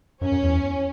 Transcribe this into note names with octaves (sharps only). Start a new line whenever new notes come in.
F#2 C#4
F#2
E2